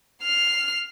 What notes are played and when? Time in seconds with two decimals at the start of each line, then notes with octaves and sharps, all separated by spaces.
0.23 F6 C7